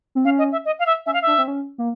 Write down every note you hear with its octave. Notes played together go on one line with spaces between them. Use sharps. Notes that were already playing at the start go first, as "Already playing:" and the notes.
C4
C#4 F5
D#5
E5
D#5
F5
E5
C#4 E5
F5
D4 E5
C4
C#4
A#3